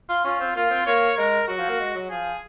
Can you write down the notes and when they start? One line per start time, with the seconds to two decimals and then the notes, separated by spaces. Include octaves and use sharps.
0.09 F4
0.24 C#4 F4
0.40 C4
0.55 A#3 F4
0.70 C4
0.86 A#3 C#5
1.17 G#3 A#4
1.48 F#3 F#4
1.59 F3
1.69 A#3
1.80 G#3
1.95 F#3
2.10 F3 G#4